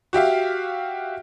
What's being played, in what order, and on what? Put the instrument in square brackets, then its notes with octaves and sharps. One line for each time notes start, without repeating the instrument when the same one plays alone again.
[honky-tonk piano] F#4 G4 E5 F5